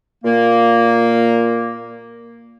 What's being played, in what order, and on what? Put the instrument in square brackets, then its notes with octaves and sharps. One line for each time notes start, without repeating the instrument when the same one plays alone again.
[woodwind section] A#2 A#3